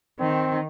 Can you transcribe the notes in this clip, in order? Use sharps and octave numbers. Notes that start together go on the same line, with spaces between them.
D#3 C4